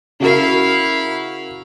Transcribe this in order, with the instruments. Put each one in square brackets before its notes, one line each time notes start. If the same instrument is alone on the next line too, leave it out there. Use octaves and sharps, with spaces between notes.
[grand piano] C#3 F#4 A#4 [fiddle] E4 F5